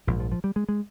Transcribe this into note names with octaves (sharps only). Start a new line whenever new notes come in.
A#1 G#2 F3
F3
F3
G3
G#3
G#3